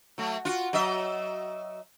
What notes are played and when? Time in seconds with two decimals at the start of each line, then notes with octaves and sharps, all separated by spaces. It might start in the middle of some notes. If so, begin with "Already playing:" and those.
0.18 F#3 A3
0.45 F4 F#4
0.73 F#3 D#5 E5